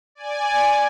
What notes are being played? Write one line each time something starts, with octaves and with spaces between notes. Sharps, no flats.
D5 G#5